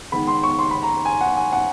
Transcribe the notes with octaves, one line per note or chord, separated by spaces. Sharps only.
D#3 G#3 B3 B5
C6
C#6
C6
B5
A#5
G#5
F#5
G#5
F#5